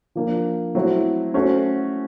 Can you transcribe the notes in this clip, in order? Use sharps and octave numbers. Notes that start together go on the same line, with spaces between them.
F3 A#3 D4
F#3 A3 C4 E4
A3 C#4 F#4 A4 C5